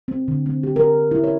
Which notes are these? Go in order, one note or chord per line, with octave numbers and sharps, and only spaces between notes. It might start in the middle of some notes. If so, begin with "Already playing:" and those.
C4
D3
C4
G4
A#4
E4
C#5